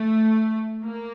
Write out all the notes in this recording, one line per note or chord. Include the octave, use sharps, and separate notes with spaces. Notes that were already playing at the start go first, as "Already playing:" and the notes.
Already playing: A3
A#3